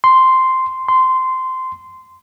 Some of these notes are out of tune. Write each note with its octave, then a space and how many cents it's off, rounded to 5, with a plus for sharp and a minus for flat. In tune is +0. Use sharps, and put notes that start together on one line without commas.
C6 -5
C6 -15